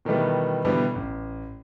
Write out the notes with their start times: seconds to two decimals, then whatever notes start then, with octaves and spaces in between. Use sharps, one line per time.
0.05 B2 D#3 E3 G3 A3 B3
0.65 B2 D3 E3 G3 B3
0.95 A1